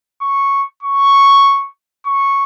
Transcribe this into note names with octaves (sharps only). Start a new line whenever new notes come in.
C#6
C#6
C#6